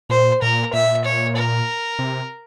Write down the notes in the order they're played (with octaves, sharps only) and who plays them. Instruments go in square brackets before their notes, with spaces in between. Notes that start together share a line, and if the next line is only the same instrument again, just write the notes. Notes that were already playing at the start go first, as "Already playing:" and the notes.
[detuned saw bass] A#2 [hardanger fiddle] C5
[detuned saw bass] A#2 [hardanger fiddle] A#4
[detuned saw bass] A#2 [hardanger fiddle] E5
[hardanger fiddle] C#5
A#4
[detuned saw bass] C3